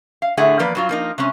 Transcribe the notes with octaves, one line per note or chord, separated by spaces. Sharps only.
F5
A2 D3 A3 G#4 E5 F#5
E2 F3 A#3 B4 D5
G2 F#3 F4
F3 A#3 D#4
C3 G#3 C#4